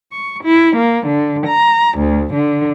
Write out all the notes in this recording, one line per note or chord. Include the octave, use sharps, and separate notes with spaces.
C#6
E4
A#3
D3
A#5
D2
D3